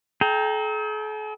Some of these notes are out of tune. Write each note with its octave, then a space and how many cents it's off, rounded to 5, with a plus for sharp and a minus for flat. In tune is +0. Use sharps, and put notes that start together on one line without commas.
A4 -45 G5 +0 A#5 +0